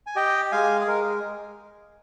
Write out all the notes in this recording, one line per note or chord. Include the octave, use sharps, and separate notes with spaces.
G#5
G4 D#5 G5
G#3 F5 G#5
G#4
G#3 A#4